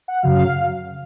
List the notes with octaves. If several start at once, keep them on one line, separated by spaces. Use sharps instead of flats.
F#5
F#2 C#3 F#3 F5